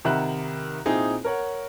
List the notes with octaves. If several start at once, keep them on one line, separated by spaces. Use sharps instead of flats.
C3 D#3 E5 F#5 B5 F#6
A#2 C4 D#4 E4 G#4
A#4 C#5 F#5